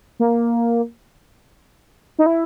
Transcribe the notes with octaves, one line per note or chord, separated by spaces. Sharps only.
A#3
D#4
E4